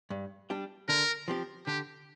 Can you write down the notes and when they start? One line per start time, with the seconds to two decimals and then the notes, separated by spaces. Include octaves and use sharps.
0.10 G2
0.50 G3 D4 G4
0.89 D3 A#4
1.28 F3 C4 G4
1.67 D3 G4